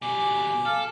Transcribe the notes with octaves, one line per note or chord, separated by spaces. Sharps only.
B2 G3 G#5 D6
A4 F5